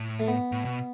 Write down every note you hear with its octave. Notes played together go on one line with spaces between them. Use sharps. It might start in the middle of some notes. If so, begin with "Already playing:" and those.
Already playing: A2
A3
B3
A2
B2